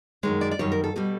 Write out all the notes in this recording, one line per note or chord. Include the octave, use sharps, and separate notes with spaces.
F#2 D#3 G#3 C#5
D5
D5
F#2 D#3 G3 C#5
A#4
A4
B2 G3 A4